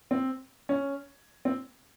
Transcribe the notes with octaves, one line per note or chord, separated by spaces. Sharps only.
C4
C#4
C4